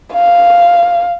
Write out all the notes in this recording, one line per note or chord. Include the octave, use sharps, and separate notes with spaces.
F5